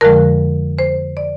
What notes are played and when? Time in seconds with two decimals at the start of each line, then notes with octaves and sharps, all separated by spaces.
0.01 F2 D3 F3 G#3 A#4
0.79 C5
1.17 D5